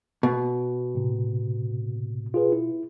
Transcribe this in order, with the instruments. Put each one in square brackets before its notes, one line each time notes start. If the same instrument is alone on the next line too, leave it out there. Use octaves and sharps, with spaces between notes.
[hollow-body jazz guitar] B2
[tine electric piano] A2 C3
F4 G#4 B4
E4